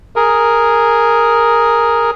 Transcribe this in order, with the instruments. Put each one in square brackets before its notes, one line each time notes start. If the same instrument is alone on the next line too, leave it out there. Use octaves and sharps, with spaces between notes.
[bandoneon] G#4 A#4